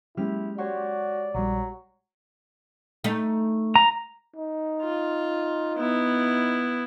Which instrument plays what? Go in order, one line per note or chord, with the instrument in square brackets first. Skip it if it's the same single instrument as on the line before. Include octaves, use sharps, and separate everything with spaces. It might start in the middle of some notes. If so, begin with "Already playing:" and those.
[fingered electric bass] F#3 A#3 C#4 [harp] G#3 G4 F6 [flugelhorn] E4
[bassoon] F#4 [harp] G4 C#5 C6 [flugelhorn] D5
[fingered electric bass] A#1 G3 [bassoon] F#3
[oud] A3 D#4
[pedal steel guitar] A#5
[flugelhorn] D#4
[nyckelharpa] F4
B3 E4